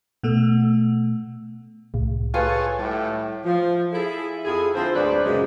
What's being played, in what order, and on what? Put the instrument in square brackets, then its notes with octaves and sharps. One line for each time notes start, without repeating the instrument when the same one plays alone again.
[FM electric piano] B2 A3
[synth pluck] C2 A2
[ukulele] F4 B4 G#5 [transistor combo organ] G#4 A4 C#5
[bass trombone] A2 [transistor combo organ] G3
[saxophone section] F3
E4 G#4 A4
F2 E4 G#4
D3 C4 F4 C5
D2 G#2 F#3 B4 C5 D5
F#2 A#2 C#3 G#3